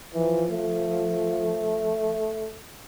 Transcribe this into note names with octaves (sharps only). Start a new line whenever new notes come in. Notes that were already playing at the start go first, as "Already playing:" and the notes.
E3 F3
A3